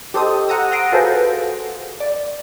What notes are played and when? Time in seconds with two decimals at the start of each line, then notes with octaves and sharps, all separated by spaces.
0.14 G4 A4 C5 D#5 D#6
0.48 F#5 A#5 D#6 E6
0.71 F#5 A#5 C6 D#6 A#6 D7
0.92 F4 F#4 G#4 A4 B4 C5
2.00 D5